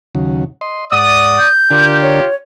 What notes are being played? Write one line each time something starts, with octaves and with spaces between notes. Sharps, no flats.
D#2 C#3 F#3
D#5 C6
G#2 D5 F#5 D#6
G6
D3 D4 F4 G4 A#4
C#5